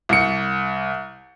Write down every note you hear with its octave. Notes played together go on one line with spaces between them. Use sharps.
C2 C#7